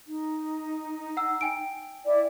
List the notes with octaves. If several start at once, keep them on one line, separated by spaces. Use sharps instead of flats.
D#4
F#5 E6
G5 G#5 D7
E4 D5